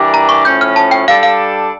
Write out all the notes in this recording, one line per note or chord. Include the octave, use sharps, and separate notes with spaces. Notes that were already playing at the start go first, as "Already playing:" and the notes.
Already playing: E3 G3 D4 G4 A#4
A#5
C#6
A2 F3 C#4 G6
F6
A5
G5
G3 D4 A4 F5
F5